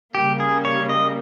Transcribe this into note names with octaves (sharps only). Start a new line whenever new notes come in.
C#3 G3 A#3 G4
G#4
C#5
D#5